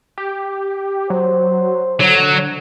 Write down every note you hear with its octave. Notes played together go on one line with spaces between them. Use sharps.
G4
F#3 C5
D3 F#3